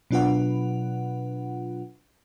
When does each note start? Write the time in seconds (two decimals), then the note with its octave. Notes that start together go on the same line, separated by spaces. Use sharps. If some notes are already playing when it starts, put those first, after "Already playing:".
0.11 B2 F#3 D4 F4 B4 F#5